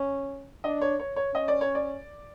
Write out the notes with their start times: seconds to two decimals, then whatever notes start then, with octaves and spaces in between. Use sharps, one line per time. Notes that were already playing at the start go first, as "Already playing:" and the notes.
Already playing: C#4
0.64 D4 D#5
0.81 C#5
0.99 C#5
1.16 C#5
1.34 C#4 D#5
1.48 D5
1.61 C#5
1.75 D5